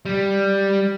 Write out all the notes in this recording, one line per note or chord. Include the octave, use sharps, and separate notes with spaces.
G3